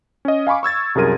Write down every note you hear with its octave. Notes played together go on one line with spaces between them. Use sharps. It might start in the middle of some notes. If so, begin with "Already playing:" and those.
C#4 D#5
F5 G#5 B5 C#6 D6
C#6 E6 G#6 A6
C2 F#2 G#4 A#4 D#7